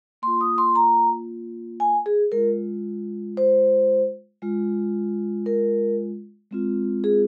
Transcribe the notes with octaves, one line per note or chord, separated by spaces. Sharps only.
A#3 F4 C6
D#6
C6
A#5
G#5
G#4
G#3 F4 A#4
C5
G#3 F4
A#4
G#3 C4 F4
G#4